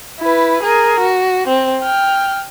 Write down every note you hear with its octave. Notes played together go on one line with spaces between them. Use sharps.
E4 B4
G#4 A#4
F#4
C4
G5 F6